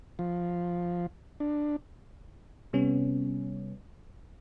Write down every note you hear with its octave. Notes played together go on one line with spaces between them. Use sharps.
F3
D4
C3 G3 B3 C#4